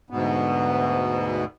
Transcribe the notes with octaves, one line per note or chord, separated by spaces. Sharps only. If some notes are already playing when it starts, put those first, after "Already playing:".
D2 G#2 B2 B3